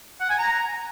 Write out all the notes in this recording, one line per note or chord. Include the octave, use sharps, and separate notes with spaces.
F#5
G#5
A#5